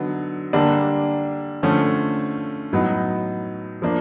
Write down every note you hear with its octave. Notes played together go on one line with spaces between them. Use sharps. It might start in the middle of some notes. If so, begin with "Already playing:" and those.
Already playing: D3 F#3 B3 D#4
D3 G3 A#3 D4
D3 F3 A3 C#4
A2 F#3 B3 D#4
F3 A#3 D4